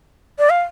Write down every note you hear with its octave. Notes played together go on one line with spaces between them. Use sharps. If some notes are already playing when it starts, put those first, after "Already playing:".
D5
F5